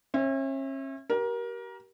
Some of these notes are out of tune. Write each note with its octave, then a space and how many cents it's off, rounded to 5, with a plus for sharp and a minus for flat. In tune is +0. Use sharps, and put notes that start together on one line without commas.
C#4 -40 E5 +0
G4 -30 A#4 +25